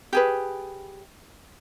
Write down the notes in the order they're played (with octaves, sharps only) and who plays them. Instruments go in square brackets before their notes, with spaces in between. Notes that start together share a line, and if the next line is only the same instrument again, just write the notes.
[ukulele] G4 G#4 B4